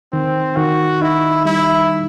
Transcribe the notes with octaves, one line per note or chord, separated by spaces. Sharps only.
D#3 C4
D#3 F#4
D#4 E4
G3 E4